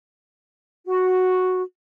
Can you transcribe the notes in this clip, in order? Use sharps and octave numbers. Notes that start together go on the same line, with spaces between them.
F#4